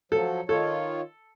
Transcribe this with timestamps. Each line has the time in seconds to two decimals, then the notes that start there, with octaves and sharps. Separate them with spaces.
0.12 F3 F#3 A4
0.49 D#3 F4 A4 C#5